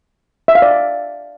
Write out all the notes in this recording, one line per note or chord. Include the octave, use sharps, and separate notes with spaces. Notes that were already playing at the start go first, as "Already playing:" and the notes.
E5
F5
D5